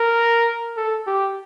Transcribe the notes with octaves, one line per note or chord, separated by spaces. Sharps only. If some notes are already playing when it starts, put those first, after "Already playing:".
Already playing: A#4
A4
G4